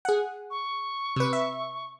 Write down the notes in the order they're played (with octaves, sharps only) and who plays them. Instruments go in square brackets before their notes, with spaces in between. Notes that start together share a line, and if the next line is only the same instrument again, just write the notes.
[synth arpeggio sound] G#4 F#5
[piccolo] C#6
[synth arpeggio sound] C3 B4
E5